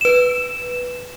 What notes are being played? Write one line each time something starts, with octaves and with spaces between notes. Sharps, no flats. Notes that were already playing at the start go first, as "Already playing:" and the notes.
B4 E7